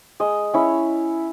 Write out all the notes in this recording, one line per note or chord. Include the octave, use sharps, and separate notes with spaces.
G#3 D#5
C#4 E4 C#5